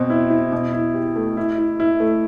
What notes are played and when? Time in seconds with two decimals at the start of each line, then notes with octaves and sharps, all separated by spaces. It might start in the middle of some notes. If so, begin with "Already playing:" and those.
Already playing: B2 C4
0.10 E4
0.30 E4
0.52 B2
0.73 E4
0.94 G4
1.16 A3
1.37 E4
1.58 E4
1.80 E4
2.00 A3